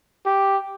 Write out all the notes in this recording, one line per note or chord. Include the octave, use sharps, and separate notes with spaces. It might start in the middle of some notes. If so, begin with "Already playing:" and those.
G4